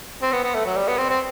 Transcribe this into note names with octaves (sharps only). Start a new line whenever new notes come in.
C4
B3
B3
A3
F#3
G3
B3
C4
C4